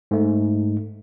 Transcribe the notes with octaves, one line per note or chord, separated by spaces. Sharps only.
G#2 A3